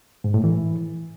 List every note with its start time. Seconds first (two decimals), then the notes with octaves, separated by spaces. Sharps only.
0.24 G#2
0.34 A2
0.44 E3